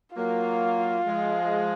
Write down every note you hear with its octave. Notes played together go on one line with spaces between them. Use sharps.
F#3 A#3 F4
F3 G#3